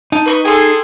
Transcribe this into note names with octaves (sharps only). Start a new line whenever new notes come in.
D#4 A5
B4 D#5 C#6
G#4 A4 G5 C6